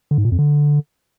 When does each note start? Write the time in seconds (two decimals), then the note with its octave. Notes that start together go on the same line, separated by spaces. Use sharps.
0.11 D3
0.18 G#2
0.25 A#2
0.32 F2
0.39 D3